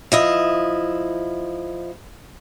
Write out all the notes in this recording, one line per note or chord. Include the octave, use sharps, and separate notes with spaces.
F3 E4 D#5